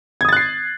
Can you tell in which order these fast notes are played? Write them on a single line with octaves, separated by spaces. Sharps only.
G#6 D#6 A6 F#6 C7